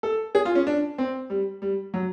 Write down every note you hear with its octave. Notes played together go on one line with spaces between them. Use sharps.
A4
G#4
F4
C#4
D4
C4
G3
G3
F#3